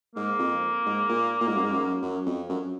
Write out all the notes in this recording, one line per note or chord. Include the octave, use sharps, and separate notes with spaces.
G#2 A#3
F2
G#2
A#2
A#2
G#2
F#2
G#2
F#2
F#2
F2
F#2